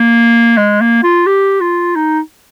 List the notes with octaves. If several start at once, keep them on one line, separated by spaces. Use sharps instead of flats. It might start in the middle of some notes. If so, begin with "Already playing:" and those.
Already playing: A#3
G#3
A#3
F4
G4
F4
D#4